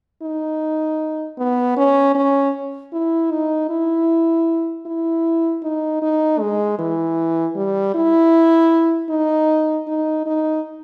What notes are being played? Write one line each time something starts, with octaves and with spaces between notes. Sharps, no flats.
D#4
B3
C#4
C#4
E4
D#4
E4
E4
D#4
D#4
G#3
E3
G3
E4
D#4
D#4
D#4